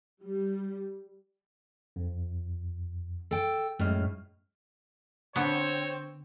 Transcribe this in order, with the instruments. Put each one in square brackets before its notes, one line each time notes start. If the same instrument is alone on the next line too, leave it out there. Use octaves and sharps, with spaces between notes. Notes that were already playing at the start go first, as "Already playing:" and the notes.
[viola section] G3
[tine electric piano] F2
[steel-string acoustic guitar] A4 G5
[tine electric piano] F#2 G#3 F6 [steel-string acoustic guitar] A2
[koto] D3 B3 [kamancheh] C4 C5 [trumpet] C#5